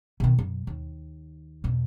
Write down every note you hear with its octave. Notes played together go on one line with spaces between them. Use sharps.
B2 D#3
F#2
D#2
E2 B2